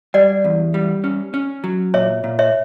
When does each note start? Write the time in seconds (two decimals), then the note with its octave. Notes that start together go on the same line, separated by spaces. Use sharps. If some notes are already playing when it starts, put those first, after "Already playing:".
0.14 G3 D5 F#5
0.44 E2
0.74 G3
1.04 C#4
1.34 C#4
1.64 F#3
1.94 A#2 C#5 E5
2.24 A#2
2.39 C#5 E5